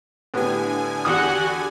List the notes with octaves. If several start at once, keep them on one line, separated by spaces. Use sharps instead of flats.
A2 D3 B3 G4 G#5
E2 F#4 G4 F#5 D6 D#6